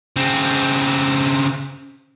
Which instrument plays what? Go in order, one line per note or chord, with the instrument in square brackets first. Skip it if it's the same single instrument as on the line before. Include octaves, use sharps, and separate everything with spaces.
[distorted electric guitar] C#3 C4